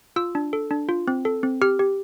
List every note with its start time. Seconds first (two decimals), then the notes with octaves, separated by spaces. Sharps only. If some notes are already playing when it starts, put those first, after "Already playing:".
0.16 F4 E6
0.35 D4
0.53 A4
0.71 D4
0.89 F4
1.08 C4
1.25 A4
1.43 C4
1.62 G4 F6
1.79 G4